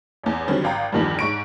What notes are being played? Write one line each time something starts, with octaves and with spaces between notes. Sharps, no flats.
A1 E2
D3 D#3 F#3 G3 C4 C#4
G#1 F5 G5 A#5
E2 G2 D#3 F3 G3
G#2 C#6 D7